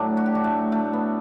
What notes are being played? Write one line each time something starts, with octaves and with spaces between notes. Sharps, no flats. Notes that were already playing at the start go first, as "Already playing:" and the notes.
Already playing: A2 F#3 D4
F#4
G4
D4 F#4
A3
A3
B3